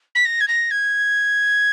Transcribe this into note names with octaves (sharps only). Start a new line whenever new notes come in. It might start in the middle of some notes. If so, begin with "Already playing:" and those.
B6
A#6
G#6
A#6
G#6